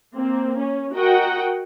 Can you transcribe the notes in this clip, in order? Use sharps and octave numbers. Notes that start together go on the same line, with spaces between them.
A#3 C4
C#4
F#4 A#4 D#5 F#5 G5